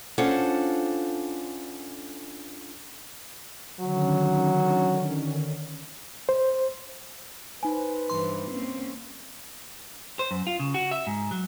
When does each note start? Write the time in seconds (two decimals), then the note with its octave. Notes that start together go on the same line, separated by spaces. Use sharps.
0.18 C#4 D4 F4 A4 C5 F#5
3.80 D3 D#3 F#3 C#4
6.29 C5
7.63 D#4 B4 C5 G#5
8.10 G2 E3 C6
8.51 A#3 C4 C#4
10.19 C5
10.31 F#2
10.47 F4
10.60 C#3
10.74 F#4
10.91 E5
11.07 G#2
11.31 F#3